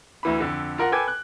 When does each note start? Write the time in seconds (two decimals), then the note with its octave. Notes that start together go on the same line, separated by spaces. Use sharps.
0.23 D2 E3 B5
0.40 F2 D3
0.78 F4 A#4 F#5
0.92 A4 B4 G5 G#5 D6 G#6
1.08 F#6